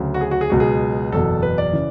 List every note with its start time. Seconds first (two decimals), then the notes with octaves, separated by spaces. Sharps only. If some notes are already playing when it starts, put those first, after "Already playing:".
Already playing: D2 C#3 F#3
0.14 F#4
0.21 G#4
0.31 F#4
0.41 G#4
0.50 C#2 B2 F#3 F#4
0.60 G#4
1.12 F#1 E2 B2 A4
1.43 B4
1.58 D5
1.73 C#3 E3